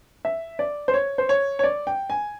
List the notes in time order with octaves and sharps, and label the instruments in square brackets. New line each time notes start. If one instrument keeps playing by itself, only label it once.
[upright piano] E5
D5
C5
C#5
C5
C#5
C#5
D5
G5
G#5